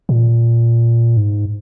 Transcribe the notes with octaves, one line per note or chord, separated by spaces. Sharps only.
A#2
G#2